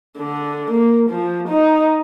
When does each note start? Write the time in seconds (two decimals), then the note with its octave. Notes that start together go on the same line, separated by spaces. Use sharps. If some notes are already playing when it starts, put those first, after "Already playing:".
0.18 D3
0.71 A#3
1.10 F3
1.48 D#4